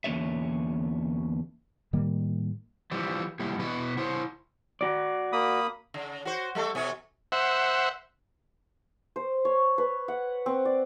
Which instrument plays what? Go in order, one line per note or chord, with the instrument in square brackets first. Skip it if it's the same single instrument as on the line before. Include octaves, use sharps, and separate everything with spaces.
[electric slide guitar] E2 D3 A#3 C#4 C#5 E5
[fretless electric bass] A2 D#3 G3 A#3
[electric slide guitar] E3 F3 G3
A#2 G3 E4
B2 E4 F#4 B4
E4 C5 C#5
F#4 D5
[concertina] A#3 B5 D#6
[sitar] C#3
F#4 C5
G3 A3 A4
B2 C#4 C#5
[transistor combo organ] C5 E5 F#5
[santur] C5
C#5
B4
F#5
C4
D5